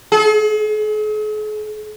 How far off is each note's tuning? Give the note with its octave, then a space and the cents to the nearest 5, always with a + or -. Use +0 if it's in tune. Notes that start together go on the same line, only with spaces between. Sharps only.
G#4 +45